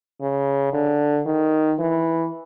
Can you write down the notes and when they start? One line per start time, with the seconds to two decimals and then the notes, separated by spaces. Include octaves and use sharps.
0.21 C#3
0.73 D3
1.26 D#3
1.79 E3